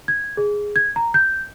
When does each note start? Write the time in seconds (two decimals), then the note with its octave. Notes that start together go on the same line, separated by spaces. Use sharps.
0.08 G#6
0.37 G#4
0.76 G#6
0.96 A#5
1.14 G6